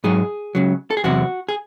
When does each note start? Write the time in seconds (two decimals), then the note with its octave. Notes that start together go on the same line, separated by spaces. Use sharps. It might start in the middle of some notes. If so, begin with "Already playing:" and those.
0.04 G#2 F#3 G#4
0.55 C#2 C#3 F#3
0.90 A4
0.97 G#4
1.04 E2 C3 F#3 F#4
1.49 G#4